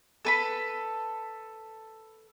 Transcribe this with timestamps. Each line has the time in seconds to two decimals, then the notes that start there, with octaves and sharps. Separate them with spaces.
0.25 A4 B4 B5